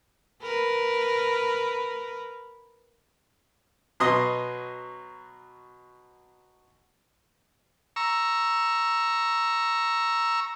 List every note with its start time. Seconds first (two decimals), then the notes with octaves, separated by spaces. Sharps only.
0.42 A#4 B4
4.00 B2 F#3 D#5 C6 D#6
7.96 A#5 C#6 E6